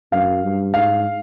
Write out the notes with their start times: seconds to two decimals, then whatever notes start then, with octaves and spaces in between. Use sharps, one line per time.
0.12 F#2 F5
0.43 G2
0.74 G#2 F5